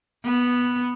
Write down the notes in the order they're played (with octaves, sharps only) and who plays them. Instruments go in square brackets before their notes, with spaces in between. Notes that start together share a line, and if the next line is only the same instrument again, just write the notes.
[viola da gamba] B3